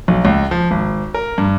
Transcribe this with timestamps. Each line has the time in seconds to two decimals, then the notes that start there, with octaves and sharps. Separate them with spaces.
0.08 B1
0.25 C#2
0.51 F3
0.71 G#1
1.14 A#4
1.38 G2